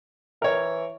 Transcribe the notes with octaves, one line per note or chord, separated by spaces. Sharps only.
E3 A#4 C#5